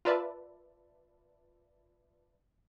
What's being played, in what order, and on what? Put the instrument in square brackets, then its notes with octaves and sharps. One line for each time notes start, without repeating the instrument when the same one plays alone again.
[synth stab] F4 A#4 B4 D5 E5 A5